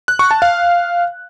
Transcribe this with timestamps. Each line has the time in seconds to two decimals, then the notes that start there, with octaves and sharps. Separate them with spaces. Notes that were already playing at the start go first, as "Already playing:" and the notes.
0.08 F#6
0.19 C#6
0.31 A5
0.42 F5